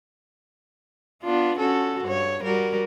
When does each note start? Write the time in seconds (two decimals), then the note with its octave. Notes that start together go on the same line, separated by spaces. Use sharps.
1.23 B3 D4 F4
1.58 C#4 F#4 A4
2.05 G2 C#5
2.43 G3 F#4 A#4